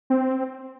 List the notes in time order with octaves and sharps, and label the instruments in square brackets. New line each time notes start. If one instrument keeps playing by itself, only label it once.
[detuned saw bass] C4